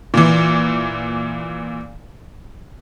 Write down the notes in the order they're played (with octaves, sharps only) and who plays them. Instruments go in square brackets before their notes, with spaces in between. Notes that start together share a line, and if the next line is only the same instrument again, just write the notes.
[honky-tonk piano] A#2 E3